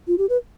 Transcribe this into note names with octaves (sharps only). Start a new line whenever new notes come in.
F4
G4
B4